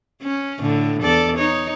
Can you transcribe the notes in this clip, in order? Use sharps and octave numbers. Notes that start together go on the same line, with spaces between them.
C#4
A2 D3
E2 A4 D5
D#4 C#5